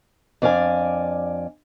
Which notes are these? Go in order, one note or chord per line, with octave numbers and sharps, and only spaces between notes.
F2 D4 D5 F5 G#5